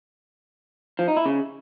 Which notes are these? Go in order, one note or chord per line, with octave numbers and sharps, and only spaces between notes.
F3
D#4
E4
C#3